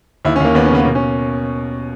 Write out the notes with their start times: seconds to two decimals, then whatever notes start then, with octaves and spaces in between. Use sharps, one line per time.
0.25 D#2 E4
0.36 C#4
0.40 D#2 A#3
0.54 D#2 B3
0.65 C#4
0.71 C#3 B3
0.81 B3
0.84 B2 A#3
0.95 C#4